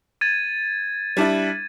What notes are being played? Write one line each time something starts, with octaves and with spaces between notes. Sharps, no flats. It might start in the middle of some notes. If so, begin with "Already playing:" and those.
G#6 A6 D#7
G3 D4 E4